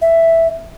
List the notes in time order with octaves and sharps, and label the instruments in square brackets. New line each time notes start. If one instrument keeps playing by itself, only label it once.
[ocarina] E5